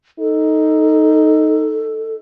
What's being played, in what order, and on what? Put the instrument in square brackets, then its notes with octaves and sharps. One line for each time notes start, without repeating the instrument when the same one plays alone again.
[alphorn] D#4 [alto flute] A4